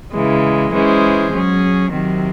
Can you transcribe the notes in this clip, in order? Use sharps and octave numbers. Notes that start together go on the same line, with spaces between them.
C#3 E3 G#3
E3 G#3 C#4 G#4 C5
F#3 C#4 G#4
C3 D#3 F#3 C4